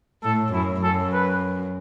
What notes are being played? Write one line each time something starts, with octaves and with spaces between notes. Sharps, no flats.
A2 A4
F#2 E4
F#2 A4
B4